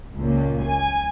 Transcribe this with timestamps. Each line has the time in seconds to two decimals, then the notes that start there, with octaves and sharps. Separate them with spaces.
0.15 C#2 A#2
0.64 G#5